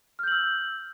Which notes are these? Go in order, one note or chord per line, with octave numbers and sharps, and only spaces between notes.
E6 F6 G6 F#7